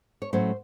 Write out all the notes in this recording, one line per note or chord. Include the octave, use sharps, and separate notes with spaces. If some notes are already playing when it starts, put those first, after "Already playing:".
C#5
A2 F#3 A3 C#4 C5